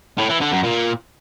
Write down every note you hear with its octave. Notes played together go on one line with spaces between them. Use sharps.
A2
E3
D3
F#2
A#2